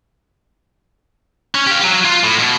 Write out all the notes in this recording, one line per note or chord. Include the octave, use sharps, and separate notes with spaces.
C#4
G4 F5
F#3
F4
A2
B2